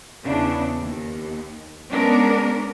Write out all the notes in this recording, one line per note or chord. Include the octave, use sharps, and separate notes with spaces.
E2 C#3 D4
D#2
G#3 B3 C#4 D4 A#4 D5